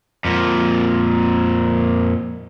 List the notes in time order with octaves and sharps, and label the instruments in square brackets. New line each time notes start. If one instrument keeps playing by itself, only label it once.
[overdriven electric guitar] F2 A#2